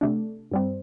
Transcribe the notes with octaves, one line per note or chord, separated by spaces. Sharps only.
C3 A3 D4
G2 G3 C4